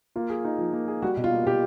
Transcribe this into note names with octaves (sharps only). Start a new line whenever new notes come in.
A#3 F4
G#4
D#4
F3
A#3
G#4
G3 F#4
B2
F4
A#3
B2 G4